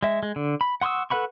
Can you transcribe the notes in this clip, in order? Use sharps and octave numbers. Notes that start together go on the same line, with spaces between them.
G#3 E5
G#3
D3
B5
F#5 C6 C#6 D#6 E6
A4 B4 F#5 B5 C#6